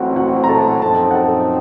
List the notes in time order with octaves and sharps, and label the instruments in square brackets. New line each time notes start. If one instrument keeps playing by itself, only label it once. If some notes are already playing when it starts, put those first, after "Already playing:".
Already playing: [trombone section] A1 A2 F#3 C4 [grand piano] F4 F#4 F#5
[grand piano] F#4 F#5
A#5
A4 A5
[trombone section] F#2 F3 C4 D#4 [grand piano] A4 A5
[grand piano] F#5
A4 A5